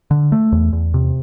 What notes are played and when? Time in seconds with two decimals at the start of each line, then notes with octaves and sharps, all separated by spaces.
0.11 D3
0.32 A3
0.52 E2
0.73 E2
0.94 C3